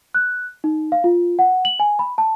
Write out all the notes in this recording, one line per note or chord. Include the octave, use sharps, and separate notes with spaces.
F#6
D#4
F5
F4
F#5
F#7
G#5
B5
A5